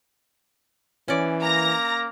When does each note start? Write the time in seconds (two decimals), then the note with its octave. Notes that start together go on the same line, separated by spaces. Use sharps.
1.08 E3 C#4 D5
1.42 A#3 A#5 A#6